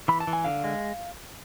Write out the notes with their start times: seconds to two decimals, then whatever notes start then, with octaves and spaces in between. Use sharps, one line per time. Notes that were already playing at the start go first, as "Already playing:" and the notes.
0.08 E3 B5
0.20 A5
0.27 E3
0.33 G#5
0.45 D3 F5
0.64 G#3